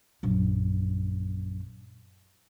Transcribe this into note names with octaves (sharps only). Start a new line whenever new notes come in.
A#1 F#2